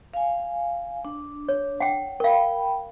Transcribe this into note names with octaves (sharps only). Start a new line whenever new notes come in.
F5 G#5
D4
C#5
F#5 G5
A#4 F5 G5 B5